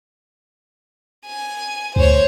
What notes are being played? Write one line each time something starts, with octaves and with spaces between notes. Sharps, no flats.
G#5
D2 C5 C#5